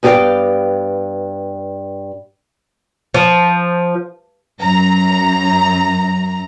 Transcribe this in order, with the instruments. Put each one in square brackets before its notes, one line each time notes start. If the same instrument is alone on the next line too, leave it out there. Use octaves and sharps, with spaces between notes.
[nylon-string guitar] G2 B3 G4 A4 F5 G5
[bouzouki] F3
[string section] F#2 A#5